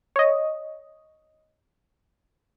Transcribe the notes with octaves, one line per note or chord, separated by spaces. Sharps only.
C#5 D#5